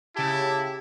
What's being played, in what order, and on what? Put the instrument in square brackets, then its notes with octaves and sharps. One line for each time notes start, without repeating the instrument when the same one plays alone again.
[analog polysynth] C#3 G4 [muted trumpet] E4 [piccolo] A5